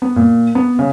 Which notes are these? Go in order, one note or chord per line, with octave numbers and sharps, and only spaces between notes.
B3
A#2
B3
C#3